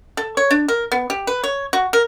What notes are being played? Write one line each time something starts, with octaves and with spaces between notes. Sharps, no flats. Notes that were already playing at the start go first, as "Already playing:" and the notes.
A4
C#5
D4
A#4
B3
G4
B4
C#5
F#4
A#4